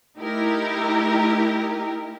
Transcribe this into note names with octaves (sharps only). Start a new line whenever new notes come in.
A3 D#4 E4 G4 A#4